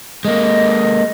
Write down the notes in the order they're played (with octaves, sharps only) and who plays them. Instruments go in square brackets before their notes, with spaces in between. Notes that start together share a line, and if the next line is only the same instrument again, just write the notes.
[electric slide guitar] G#3 A#3 [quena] D#5